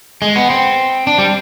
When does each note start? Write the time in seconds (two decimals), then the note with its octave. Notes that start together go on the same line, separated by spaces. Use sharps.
0.22 G#3
0.36 B3
0.50 C4
1.07 D4
1.18 G3